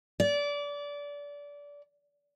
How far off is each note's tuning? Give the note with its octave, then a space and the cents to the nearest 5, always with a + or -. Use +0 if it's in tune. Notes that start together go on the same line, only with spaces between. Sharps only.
D5 -25